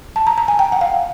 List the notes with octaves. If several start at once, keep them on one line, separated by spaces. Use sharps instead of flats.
A5
A#5
A#5
G#5
G5
F#5
F5